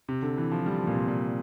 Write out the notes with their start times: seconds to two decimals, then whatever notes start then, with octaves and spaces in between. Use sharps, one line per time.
0.09 C3
0.22 D3
0.37 E3
0.52 F3
0.66 G3
0.79 F3
0.87 A#2
0.94 C3
1.08 A#2